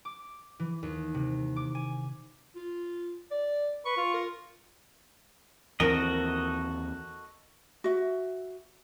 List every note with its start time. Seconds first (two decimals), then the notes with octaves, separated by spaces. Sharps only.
0.05 D6
0.60 E3
0.83 D#2
1.15 C3
1.56 D6
1.75 G#5
2.56 F4
3.31 D5
3.85 B4 C#6
3.97 F4
4.14 A#4
5.80 D#2 E3 C4 F#4 A4 A#4 D#5
7.84 F#4 E5